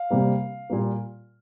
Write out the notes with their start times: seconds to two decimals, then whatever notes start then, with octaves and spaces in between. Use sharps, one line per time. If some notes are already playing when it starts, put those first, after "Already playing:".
Already playing: F5
0.11 C3 G3 A#3
0.70 A#2 G3 A#3